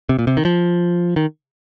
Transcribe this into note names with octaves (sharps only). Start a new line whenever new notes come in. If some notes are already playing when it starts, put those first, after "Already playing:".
C3
A#2
C3
D#3
F3
D#3